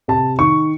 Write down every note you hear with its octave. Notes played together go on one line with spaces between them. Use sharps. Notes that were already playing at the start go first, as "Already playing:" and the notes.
C3 A5
D#3 C#6